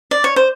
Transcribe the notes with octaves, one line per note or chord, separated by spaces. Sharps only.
D5
C#5
C5